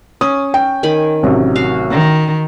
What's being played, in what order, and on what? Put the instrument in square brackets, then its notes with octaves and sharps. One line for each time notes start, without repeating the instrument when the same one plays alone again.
[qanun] C#4 [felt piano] D#6
[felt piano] G5
[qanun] D#3 G#5 B5
[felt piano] A1 C3 F#3
[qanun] F#4 F5
[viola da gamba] D#3